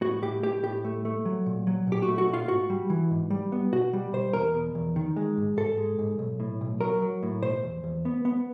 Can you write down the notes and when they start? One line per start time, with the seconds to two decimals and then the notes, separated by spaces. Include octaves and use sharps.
0.01 A2 F#4
0.22 A2 G4
0.43 A2 G4
0.63 A2 G4
0.85 A3
1.05 A3
1.25 F#3
1.46 A#2
1.67 F#3
1.87 A#2 G4
2.02 F#4
2.08 A3
2.18 F#4
2.29 A#2 F4
2.48 G#2 F#4
2.70 G3
2.90 E3
3.11 G#2
3.30 G3
3.52 B3
3.73 B2 F#4
3.93 G3
4.13 B2 C5
4.33 E2 A#4
4.54 B2
4.75 E2
4.96 D#3
5.16 G#3
5.37 G#2
5.57 G#2 A4
5.78 G#3
5.99 G#2
6.19 B1
6.40 A2
6.61 B1
6.81 F#3 A#4
7.02 F#3
7.23 A2
7.42 B2 C5
7.63 E2
7.84 E2
8.05 B3
8.25 B3